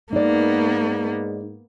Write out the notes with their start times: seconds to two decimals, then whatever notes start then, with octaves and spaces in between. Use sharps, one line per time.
0.13 G#2 A#3 B3 D#4 D5